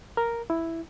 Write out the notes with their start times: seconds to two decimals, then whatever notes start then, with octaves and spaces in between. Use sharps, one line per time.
0.17 A#4
0.50 E4